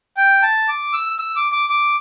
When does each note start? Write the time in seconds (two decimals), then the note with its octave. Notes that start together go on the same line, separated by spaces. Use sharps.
0.17 G5
0.43 A5
0.68 D6
0.94 E6
1.19 E6
1.36 D6
1.52 D6
1.69 D6